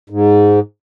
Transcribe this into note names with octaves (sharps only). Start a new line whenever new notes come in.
G#2